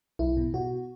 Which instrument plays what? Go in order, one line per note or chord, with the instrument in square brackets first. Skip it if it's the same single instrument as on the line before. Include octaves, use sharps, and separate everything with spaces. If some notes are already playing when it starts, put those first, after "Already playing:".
[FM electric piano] B1 E4
B2
B2 F#4